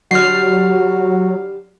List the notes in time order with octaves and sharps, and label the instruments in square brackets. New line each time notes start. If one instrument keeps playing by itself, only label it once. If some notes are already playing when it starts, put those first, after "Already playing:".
[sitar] D3 G3 [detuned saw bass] F#3 [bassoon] F#4 [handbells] F6 C7